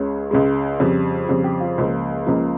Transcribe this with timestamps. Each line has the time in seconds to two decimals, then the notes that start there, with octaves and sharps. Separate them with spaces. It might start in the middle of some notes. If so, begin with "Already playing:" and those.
Already playing: C#2 C#3 G#3 C#5
0.31 C#2 C#3 G#3
0.80 F2 C#3 G3
1.28 F2 C#3 G3
1.44 G4
1.60 F4
1.78 C#2 C#3 F3 A#3
2.26 C#2 C#3 F3 A#3